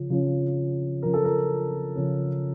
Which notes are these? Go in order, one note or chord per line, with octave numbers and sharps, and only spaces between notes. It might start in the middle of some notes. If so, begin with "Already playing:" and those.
Already playing: C#3 F3
C#3 F3 C#4
C#3 F3 C#4 A#4
A4
A#4
C#3 F3 C#4